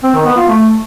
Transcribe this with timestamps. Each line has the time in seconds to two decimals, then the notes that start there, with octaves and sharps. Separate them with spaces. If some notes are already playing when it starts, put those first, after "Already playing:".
0.04 C4
0.15 D#3
0.26 B3
0.37 F4
0.48 A3